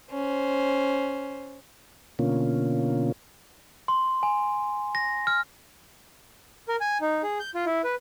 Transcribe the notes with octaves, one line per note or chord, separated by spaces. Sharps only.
C#4 C5
B2 D3 A#3 C#4 F4
C6
G#5
A#6
F6
A#4
G#5
D#4
G#4
G6
F4
E4
B4